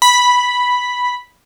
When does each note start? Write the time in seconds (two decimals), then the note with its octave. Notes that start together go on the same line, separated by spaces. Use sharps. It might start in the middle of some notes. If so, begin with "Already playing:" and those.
0.02 B5